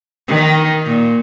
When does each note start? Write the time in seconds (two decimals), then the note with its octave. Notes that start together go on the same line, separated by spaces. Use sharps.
0.28 D#3
0.86 A#2